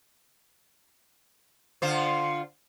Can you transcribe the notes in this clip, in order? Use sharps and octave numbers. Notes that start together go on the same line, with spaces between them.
D3 F4 C5